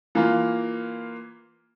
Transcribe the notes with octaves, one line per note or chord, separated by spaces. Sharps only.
E3 A#3 F4